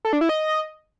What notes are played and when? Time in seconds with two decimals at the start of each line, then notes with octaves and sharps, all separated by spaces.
0.05 A4
0.13 D4
0.21 E4
0.29 D#5